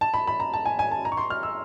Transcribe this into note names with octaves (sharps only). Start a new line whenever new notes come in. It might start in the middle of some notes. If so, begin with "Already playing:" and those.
A5
B5
B5
A#5
A5
G#5
G#5
A5
A#5
C#6
C6
F6
E6